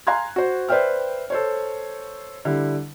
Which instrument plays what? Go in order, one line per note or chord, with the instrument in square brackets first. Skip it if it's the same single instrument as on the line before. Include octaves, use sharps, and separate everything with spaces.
[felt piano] F5 G#5 A#5 C6 F#6 G#6
F#4 C5
B4 C5 D5 E5 G5 F6
A4 C5 C#5
D3 G3 E4